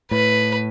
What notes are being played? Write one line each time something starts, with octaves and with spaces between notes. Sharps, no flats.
A2 B4